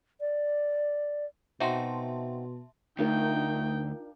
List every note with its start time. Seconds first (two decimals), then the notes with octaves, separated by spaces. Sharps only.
0.21 D5
1.60 B2 C4 D#4 F#4 E5 A5 C6
2.99 D2 A3 D4 D#4 F4 A#4 G5